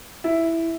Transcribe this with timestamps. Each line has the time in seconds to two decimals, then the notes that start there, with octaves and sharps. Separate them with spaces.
0.24 E4